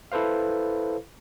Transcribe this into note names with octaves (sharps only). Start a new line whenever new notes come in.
E4 A4 B4 C5 F5